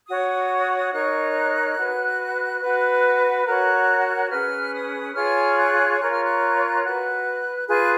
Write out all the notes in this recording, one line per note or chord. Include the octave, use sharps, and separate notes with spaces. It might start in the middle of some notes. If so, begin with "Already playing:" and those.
F#4 C#5 D#6
D#4 A#4 C#5 F#6
F#4 B4
F#4 B4
F#4 A#4 C#5 F#6
C#4 G#4 B4 F6
D#6
F4 G#4 C#5 F6
F#6
F4 A#4 C#5 F#6
F6
F#6
F#4 B4 F#6
F4 G#4 B4 F#6